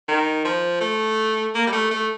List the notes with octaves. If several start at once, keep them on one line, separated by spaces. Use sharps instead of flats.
D#3
F3
A3
A#3
G3
A3
A3